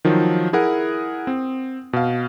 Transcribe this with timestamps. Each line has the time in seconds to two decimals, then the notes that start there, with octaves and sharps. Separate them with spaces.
0.05 D#3 F3 F#3
0.53 E4 G#4 A#4 F#5 D#6
1.27 C4
1.93 B2 F5